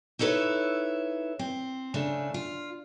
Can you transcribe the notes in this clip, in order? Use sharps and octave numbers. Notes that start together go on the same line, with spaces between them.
D#4 E4 A4 B4 C#5
C4
C#3 A3 D4
F4